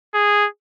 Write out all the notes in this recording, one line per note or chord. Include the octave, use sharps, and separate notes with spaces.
G#4